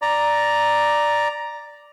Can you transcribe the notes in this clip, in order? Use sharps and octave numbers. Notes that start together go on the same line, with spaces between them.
D5 A#5